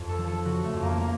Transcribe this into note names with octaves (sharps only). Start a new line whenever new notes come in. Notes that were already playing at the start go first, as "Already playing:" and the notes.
Already playing: F2
A4
F3
A4
C#3 F#4
A3
F2
A#3
A#3